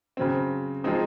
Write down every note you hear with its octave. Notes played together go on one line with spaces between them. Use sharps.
C#3 F#3 C4
F3 G#3 C4 D#4